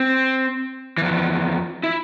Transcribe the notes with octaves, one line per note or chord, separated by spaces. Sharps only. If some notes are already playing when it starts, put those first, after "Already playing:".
Already playing: C4
F2 E3
E4